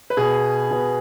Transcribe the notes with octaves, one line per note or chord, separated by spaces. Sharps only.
B4
B2 B3 G#4
B2 B3